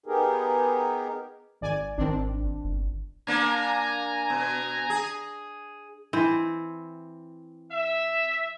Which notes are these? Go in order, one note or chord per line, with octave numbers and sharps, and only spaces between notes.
B3 D#4 G4 G#4 A#4
G#1 D5 G#5
G#1 D#3 C4 D4
G1
A#3 D4 G#5 A#5
B2
G#4
E3 C4
E5